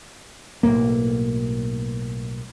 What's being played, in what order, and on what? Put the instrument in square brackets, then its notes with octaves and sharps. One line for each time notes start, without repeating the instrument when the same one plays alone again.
[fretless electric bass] B1 E2 A2 A#3